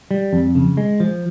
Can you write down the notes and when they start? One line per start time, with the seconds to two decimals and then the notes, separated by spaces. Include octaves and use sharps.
0.11 G3
0.33 F2
0.55 C#3
0.77 G#3
1.00 F3